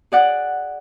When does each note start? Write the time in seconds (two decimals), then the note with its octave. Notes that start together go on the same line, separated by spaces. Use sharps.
0.12 G#4 D5 F#5